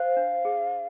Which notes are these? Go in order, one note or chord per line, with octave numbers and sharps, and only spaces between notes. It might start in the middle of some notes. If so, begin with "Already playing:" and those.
Already playing: C5 F5
D4
G#4